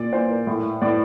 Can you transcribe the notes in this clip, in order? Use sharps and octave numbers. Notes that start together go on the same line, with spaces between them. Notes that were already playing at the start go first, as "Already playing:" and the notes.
Already playing: A#2 D5
A#2 C5
A#4
A2
A2 D5